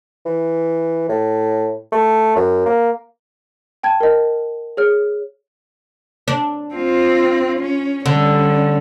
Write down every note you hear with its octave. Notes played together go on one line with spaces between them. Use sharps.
E3
A2
A3
F#2
A#3
G5 A5 G#6
A#4 D#5
G#4 C#5 F6
D4
C4 F4
C#4
D3 G3 C#4